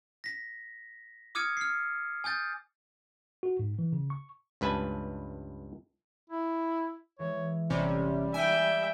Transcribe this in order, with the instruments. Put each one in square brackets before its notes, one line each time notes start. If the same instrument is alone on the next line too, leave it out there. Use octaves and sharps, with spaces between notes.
[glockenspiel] A#6 B6
D6 D#6 F6 G#6 C#7 D#7
F6 C7
G#5 D#6 G6 A6
[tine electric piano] F#4
G#2
E3
C#3
C#6
[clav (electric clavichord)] C#2 G2 B4 G#5 A5
[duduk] E4
[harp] E3 G#3 [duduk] C#5
[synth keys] G1 C3 C#4 [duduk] G3
[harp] D#4 [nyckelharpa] E5 G5 [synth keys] G#5